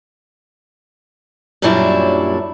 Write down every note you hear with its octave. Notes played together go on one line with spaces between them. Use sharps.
F#2 A#2 F#3 G3 D4 E4